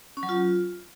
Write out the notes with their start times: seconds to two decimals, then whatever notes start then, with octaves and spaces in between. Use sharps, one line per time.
0.17 C#4
0.23 F#3
0.29 F4